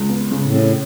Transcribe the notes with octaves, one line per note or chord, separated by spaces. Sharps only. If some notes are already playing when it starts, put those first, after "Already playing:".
Already playing: C#2
B3
C#3
A2
C#3